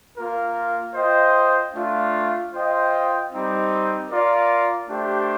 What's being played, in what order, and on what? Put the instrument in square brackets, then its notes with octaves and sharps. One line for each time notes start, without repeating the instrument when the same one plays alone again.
[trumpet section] A#3 F4 A#4
F4 C5 D#5 G5
A3 D4 F4
F4 C5 D#5 G5
G3 C4 D#4
F4 A#4 D5
A3 D4 G4 C5